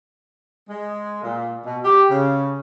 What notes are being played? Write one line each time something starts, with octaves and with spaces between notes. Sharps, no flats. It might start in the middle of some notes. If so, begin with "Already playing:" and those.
G#3
A#2
B2
G4
C#3